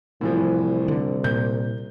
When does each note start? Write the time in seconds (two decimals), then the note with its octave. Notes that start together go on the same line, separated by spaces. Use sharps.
0.21 C2 A2 E3 F3
0.88 D3
1.24 A#2 G6